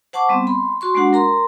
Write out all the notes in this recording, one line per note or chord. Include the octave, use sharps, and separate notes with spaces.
C5 F#5 A5 C#6 D6
G3 B3 C4
B5 C6
F#4 C6 C#6
G#3 A#3 D4 F#4 F#5
A#4 A#5 C6